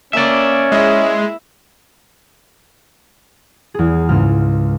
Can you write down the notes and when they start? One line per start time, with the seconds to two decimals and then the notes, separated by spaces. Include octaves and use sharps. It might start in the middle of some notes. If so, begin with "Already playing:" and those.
0.13 A#3 C#4 D5 E5
0.72 G#3 E4
3.74 E2 G#4
4.09 C#2 G#2 F6